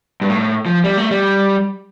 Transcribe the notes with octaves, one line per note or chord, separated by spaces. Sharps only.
G2
A2
F3
G3
A3
G3